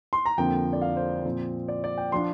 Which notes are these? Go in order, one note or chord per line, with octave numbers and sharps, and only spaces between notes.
C6
A#5
F2 D3 F3 A#3 G5
D5
F5
C5
A#2 F3 C4
D5
D5
G5
F3 D4 F4 C6